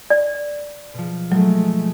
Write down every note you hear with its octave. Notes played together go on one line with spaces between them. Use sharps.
D5
B2 F3
F#3 G#3 A3